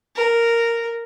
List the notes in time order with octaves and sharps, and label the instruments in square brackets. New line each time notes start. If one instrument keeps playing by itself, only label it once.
[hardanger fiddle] A#4